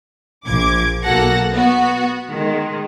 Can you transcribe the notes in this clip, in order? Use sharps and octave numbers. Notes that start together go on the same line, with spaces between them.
A#1 F3 D6 G#6
B1 A#3 F#4 A4 F#5 A#6
B3 F#4
D#3 G#3